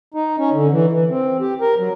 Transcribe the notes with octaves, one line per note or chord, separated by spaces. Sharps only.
D#4
C#4
D3
E3
E3
C4
G4
A#4
F#3